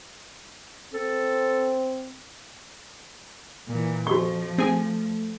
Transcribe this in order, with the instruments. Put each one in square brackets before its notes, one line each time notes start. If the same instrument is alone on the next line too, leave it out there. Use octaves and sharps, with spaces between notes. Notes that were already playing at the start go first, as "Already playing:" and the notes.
[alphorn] C4 [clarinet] A4
[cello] A#2 E3
[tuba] F2 [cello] F3 [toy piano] F#4 C#6
[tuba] A3 [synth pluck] C4 G#4 G#5